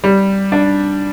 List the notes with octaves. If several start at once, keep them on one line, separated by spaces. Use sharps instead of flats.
G3
D4